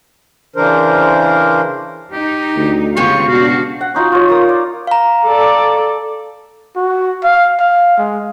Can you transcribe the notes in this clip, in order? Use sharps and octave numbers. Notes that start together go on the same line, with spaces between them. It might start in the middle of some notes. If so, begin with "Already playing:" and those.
C#3 E3 D4 A#4 C5
D#4 G4
D2
C#3 G#3 B3 C#4 F4 G4 C#6
B2 D4 F#4 F5
F#5
C#4 D#4 F4 F#4
F4 C#5
F4 A#4 D#6
D5
F5 A#5
A4 D5
F#4
F5
F5
G#3